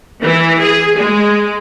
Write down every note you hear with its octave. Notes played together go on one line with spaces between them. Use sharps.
E3
G#4
G#3